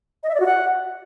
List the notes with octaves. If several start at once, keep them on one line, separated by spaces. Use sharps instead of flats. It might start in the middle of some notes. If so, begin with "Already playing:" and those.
D#5
E5
D5
F#4
F#5